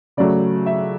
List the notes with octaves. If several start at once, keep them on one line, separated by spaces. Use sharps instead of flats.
C#3 F#3 A3 D5
E5